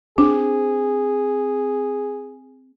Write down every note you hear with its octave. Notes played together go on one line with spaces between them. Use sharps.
C4 D4 G#4